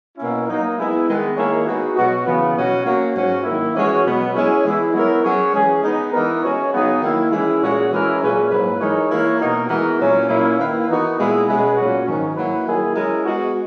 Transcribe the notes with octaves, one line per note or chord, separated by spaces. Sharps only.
B2 A#3 C#4 E4
F#3 A#3 D#4
G#3 B3 E4
D#3 G#3 B3
D#3 A#3 E4 G#4 C#5
G#3 B3 D#4 F#4
B2 F#3 B3 F#4
C#3 E3 B3
B2 F#3 C#4 F#4
F#3 A#3 C#4 F#4
G#2 F#3 C#4 F#4
D#3 A#3 E4
E3 G#3 C#4 F#4 C#5
B2 F#3 B3
G#3 C#4 E4 G#4 C#5
E3 G#3 B3 E4
F#3 B3 E4 A#4 C#5
F#3 C#4 G#4 C#5
E3 G#3 C#4 G#4
G#3 B3 D#4
E3 B3 D#4 A#4
G#3 C#4 F#4 C#5
C#3 F#3 B3 D#4 G#4
D#3 A#3 E4
E3 G#3 C#4 E4
A#2 G#3 C#4 F#4
E3 G#3 C#4 E4 A#4
A#2 F#3 C#4 G#4 B4
G#2 F#3 A#3 E4 B4
E3 G#3 D#4 A#4 C#5
E3 A#3 E4 A#4 C#5
B2 A#3 D#4 F#4 A#4
E3 G#3 B3 F#4 A#4
A#2 F#3 C#4 E4
A#2 A#3 C#4 E4
D#3 A#3 E4 B4
E3 B3 D#4 F#4 A#4
A#2 G#3 B3 E4
B2 G#3 C#4 G#4 B4
A#2 F#3 C#4 F#4
G#2 D#3 F#3 C#4
F#3 A#3 E4 B4
D#3 F#3 A#3 E4 G#4
G#3 C#4 E4 A#4
G#3 B3 F#4